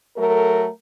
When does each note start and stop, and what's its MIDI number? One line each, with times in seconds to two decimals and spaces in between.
0.17 0.67 54
0.17 0.67 57
0.17 0.67 69
0.17 0.67 70